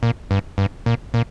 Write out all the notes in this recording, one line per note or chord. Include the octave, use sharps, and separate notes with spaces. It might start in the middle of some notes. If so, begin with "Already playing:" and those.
A#2
G2
G2
A#2
A#2